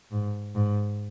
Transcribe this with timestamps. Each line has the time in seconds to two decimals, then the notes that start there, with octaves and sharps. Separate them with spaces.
0.11 G#2
0.55 G#2